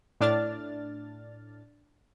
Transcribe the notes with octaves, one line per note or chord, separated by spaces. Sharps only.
A2 D4 D5 F6 A6